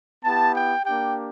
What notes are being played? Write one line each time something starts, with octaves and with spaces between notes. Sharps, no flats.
B3 E4 G4 A5
G5
A#3 D4 G4 G5